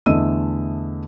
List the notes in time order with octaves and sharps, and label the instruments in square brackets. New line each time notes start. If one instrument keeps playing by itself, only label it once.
[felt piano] E2 D3 A3 D#5 E6 D#7